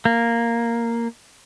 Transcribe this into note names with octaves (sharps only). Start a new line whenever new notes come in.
A#3